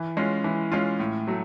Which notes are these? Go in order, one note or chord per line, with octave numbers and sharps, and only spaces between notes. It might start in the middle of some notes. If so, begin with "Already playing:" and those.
Already playing: E3
G#3 C#4 F4
E3
G#3 C#4 F4
A2
F#3 A3